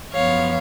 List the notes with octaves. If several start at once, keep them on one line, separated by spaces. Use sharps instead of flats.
F#2 F3 B3 C#5 F5